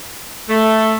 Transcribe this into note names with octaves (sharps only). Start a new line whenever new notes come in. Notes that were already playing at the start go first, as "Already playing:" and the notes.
A3